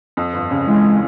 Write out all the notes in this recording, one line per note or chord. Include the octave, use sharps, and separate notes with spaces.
F2
G1
C#3
E3 G#3